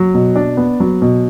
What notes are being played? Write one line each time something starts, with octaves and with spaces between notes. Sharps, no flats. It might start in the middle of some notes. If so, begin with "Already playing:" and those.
Already playing: F#3
B2
D4
B3
F#3
B2